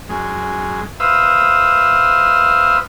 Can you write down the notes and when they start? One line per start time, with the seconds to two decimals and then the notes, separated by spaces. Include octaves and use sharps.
0.09 F#2 G#3
1.00 B4 C5 E5 F5 D#6 E6